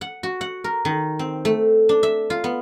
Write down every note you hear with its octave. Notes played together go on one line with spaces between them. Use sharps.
F#5
F#4
F#5
A#4
D#3
C4
A3
D4
E5
F4
B3